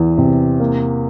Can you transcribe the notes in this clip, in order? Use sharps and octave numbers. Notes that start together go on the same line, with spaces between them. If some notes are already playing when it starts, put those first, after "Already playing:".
Already playing: E2 E3
C3
A#3